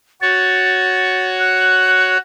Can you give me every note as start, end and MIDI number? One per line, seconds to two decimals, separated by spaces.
0.22 2.17 66
0.22 2.17 73
0.22 1.28 93
1.39 2.19 90